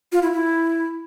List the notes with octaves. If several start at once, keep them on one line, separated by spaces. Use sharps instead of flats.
F4
E4
E4